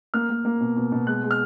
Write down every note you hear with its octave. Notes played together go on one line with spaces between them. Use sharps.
A#3 F6
A#3
A#3
B2
B2
B2
G#3 F#6
G#3
F6